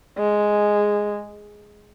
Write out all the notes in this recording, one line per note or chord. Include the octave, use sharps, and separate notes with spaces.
G#3